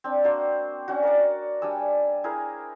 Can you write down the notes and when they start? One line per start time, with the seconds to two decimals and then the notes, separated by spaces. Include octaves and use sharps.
0.04 C4 D4
0.24 A#3 D4 F#4 C5
0.88 C#4 D4 F#4
1.03 A#4 D5
1.62 G3 D4 G#5 E6
2.24 E4 G#4 A#4 C5